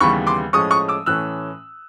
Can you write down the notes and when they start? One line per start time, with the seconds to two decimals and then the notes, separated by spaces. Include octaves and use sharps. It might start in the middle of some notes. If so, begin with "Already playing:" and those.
0.01 D#2 C#3 E3 G3 B3 B5 C#6
0.27 C6 D6
0.53 A2 F3 G#3 C#4 C#6 D#6
0.71 C#6 D#6
0.88 D6 E6
1.06 A2 E3 A3 C#4 E6 F#6